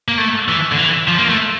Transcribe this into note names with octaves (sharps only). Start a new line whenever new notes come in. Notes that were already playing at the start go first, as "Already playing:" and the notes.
A#3
A3
E3
D3
E3
F3
A#3
A3